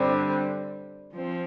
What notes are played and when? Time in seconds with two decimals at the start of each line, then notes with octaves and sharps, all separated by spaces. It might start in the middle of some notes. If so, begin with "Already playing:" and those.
Already playing: G2 D3 G3 C4
1.13 F3 C4